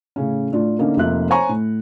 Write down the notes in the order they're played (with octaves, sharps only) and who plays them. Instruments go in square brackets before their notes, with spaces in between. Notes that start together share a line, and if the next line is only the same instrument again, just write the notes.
[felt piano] A2 C#3 C#4
A2 A3 D4 F4
D3 A#3 C#4 D#4 A#4
F1 F3 A#3 F4 E5 F#6
C5 C#5 G#5 A#5 C#6
A2